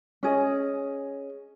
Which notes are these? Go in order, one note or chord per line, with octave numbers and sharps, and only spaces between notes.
C#4 G#4 D#5